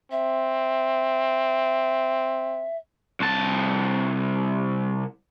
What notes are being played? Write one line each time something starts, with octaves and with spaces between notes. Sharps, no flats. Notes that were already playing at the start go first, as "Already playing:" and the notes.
C4 E5
C2 A5